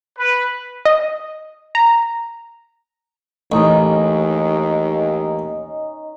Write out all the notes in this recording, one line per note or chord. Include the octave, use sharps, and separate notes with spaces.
B4
D#5
A#5
A1 D#2 C#4 D#4 D#5